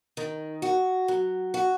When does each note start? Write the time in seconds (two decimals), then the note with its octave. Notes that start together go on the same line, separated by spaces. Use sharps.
0.17 D#3
0.62 F#4
1.08 F#3
1.54 F#4